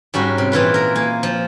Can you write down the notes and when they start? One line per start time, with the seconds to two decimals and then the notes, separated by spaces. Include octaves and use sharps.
0.14 G#2 G3 C#4 F#4 A#4
0.38 C3
0.52 A#2 E3 F4 B4
0.74 A#4 A#5
0.95 A#3 G#5
1.23 F3